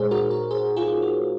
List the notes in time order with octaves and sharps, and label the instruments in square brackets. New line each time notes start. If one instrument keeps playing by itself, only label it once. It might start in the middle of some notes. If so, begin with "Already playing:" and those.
Already playing: [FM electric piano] A#2 G#3 D#4 G#4 C5 C#5
F#4 A#4
A#4 C#5
G#4 C5
F4 G#4
F#4